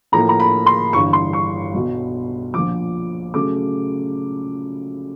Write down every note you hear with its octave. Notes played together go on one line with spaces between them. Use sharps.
A2 F3 A#3 A#5
A#5
B5
C6
G1 G2 E3 C#6
C6
C#6
B1 B2 F#3
A#1 A#2 F3 D6
C#3 F#3 A3 C#4 D6